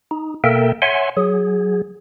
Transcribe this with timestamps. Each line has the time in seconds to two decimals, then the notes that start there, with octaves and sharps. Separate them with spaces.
0.11 D#4
0.44 B2 A#3 A4 A#4 E5 G5
0.82 C#5 E5 F#5 G#5 C6
1.17 F#3 G#4